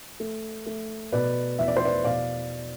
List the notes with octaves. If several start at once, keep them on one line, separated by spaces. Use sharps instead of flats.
A3
A3
B2 B4 D5
E2 E5
D5
C5
B4 D5
B2 D5 F5